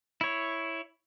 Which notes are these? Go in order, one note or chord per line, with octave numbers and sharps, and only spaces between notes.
E4 C#5